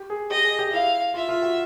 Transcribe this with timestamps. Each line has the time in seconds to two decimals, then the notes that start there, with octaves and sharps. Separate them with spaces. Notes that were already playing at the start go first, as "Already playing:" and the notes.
Already playing: G4
0.10 G#4
0.31 G4 D#5
0.44 G#4
0.59 G4
0.72 E4 F5
1.14 F4 E5
1.29 F4
1.42 F#4